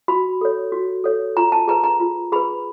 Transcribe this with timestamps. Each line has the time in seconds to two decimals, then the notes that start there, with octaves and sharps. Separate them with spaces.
0.08 F#4 B5
0.41 A4 C#5
0.72 F#4
1.04 A4 C#5
1.37 F4 A#5
1.52 A5
1.68 G#4 B4 A#5
1.84 A#5
2.00 F4
2.32 G#4 B4 B5